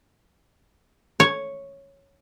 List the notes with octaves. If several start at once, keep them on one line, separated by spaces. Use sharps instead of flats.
C#5